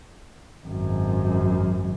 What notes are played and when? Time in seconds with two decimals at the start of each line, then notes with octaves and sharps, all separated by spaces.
0.65 G#1 F#2